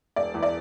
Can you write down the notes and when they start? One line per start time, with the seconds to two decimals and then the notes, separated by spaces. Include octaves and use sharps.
0.16 E1 D5
0.34 E2
0.43 D5